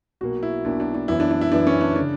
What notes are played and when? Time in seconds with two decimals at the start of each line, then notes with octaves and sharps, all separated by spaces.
0.21 B1 B2 A#3 F#4
0.43 E4
0.65 B1 B2 A#3 D4
0.80 D4
0.94 D4
1.08 F#2 E3 B3 E4
1.20 D4
1.31 D4
1.41 E4
1.52 F#2 E3 B3 D4
1.67 C#4
1.81 D4
1.96 C#3 D4